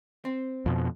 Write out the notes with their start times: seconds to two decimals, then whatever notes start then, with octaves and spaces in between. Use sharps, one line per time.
0.25 C4
0.66 F2 B2